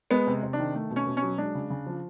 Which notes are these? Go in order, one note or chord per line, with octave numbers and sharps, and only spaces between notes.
G#3 B3
C3
C3
D4
D#3
A3
B2
C#4
B2
C#4
F#3
G#3 D4
C#3
C#3
F3